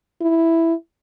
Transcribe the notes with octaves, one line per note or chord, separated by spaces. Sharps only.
E4